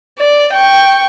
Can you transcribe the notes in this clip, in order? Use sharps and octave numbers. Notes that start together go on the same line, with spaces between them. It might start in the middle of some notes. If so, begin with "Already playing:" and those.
D5
G5 C#6